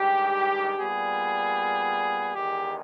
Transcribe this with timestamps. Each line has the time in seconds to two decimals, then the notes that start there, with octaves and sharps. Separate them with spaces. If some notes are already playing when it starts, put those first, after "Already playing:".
Already playing: G2 D#3 G#3 G4
0.78 A#2 G3 B3 G#4
2.34 E2 D#3 G#3 G4